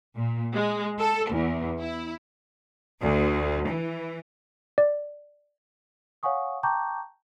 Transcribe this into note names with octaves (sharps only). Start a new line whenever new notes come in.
A#2
G#3
A4
E2
E4
D2
E3
D5
C#5 F5 F#5 G#5 C#6 D#6
G5 A5 A#5 C#6 D6 G6